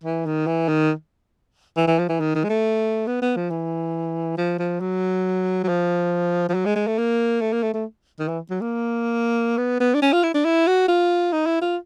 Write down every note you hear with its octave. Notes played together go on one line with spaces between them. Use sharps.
E3
D#3
E3
D#3
E3
E3
F3
E3
D#3
D#3
G#3
A3
B3
B3
F3
E3
F3
F3
F#3
F#3
F3
F3
F#3
G#3
G#3
A3
A#3
A3
A#3
A3
A3
D#3
E3
F#3
A#3
B3
B3
D4
C#4
F4
E4
D4
E4
F#4
F4
D#4
E4
F4